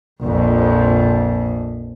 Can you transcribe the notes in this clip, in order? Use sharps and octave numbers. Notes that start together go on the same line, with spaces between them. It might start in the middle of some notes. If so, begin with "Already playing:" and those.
A#1 F2